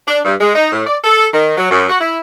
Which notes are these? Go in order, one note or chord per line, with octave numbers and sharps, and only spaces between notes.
D4
G2
G#3
D#4
A2
D5
A4
D#3
F#3
F#2
F#4
E4